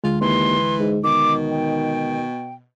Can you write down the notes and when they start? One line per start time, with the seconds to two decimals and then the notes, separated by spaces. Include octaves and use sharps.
0.04 D2 D3 G#3 F4
0.21 D#2 E3 C6
0.79 G#2
1.04 B2 D#3 D6
1.51 G5